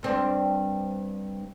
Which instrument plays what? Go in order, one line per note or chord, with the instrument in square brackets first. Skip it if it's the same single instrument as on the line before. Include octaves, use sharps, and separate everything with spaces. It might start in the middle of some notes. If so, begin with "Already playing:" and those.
[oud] G2 C4 D4